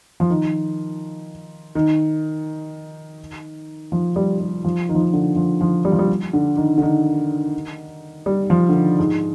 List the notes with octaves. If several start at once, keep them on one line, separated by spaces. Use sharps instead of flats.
F3
D#3
D#3
F3
G3
G3
F3
D#3
F3
D#3
D3
F3
F3
G3
F3
G3
D3
D#3
D3
D#3
G3
F3
D3
D#3
G#2